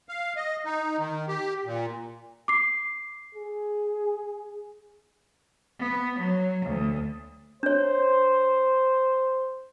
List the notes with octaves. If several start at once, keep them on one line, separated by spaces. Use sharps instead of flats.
F5
D#5
D#4
D#3
G4
A#2
D6 C7
G#4
B3
F#3
D2
D4 C5 C#5